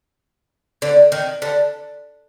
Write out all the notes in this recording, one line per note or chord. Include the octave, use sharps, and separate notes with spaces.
D3
D#3
D3